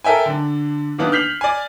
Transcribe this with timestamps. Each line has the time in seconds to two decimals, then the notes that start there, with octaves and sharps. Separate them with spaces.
0.04 A4 A#4 E5 G5 G#5
0.26 D3 D4
0.98 D#3 E3 A#3 B3 D4
1.12 F6 G6 B6 C7 F7 F#7
1.41 D5 G#5